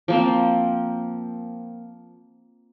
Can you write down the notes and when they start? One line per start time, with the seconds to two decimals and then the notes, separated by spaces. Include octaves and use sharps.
0.08 F3 A#3 C4